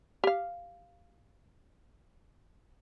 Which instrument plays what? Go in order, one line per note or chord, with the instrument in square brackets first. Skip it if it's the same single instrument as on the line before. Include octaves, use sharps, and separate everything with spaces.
[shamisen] G4 F5